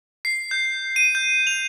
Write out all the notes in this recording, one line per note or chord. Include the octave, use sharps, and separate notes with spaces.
C7
G6
D#7
G6
F7